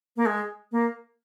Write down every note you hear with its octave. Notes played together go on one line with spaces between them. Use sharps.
A#3
G#3
A#3